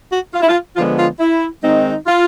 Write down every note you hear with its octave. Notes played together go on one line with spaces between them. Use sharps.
F#4
F4
E4
F4
D3 F3 G#3 B3 F4
F4
E4
D#3 G#3 C4 D#4
F4